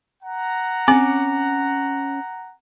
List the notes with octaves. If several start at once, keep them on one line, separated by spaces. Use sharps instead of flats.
F#5 A#5
C4 C#4 D6